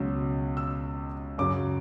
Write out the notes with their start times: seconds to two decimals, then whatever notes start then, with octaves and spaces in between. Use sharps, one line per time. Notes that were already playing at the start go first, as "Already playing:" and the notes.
Already playing: C#2 B2 F#3 C#4 E6
0.57 E6
1.38 F#2 C#3 F#3 D6